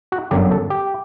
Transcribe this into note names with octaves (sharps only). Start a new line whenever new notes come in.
F#4
G1 F#2 D3 F#3 G4
A4
G4